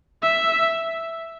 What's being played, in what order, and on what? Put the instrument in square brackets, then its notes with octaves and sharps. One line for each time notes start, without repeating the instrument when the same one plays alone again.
[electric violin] E5